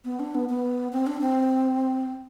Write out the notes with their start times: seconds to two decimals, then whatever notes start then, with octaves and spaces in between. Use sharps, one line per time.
0.05 B3
0.20 D4
0.35 B3
0.49 B3
0.92 C4
1.07 D4
1.21 C4